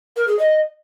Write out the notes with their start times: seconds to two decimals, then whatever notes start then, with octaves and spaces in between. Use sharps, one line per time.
0.16 A#4
0.28 G#4
0.39 D#5